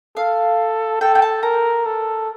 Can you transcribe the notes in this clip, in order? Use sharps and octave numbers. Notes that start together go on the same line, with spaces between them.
A4 F5
A4 G5
G5
A5
A#4 A#5
A4